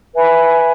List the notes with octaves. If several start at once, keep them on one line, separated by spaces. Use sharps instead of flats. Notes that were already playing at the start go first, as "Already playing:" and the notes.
B4 E5 G#5 B5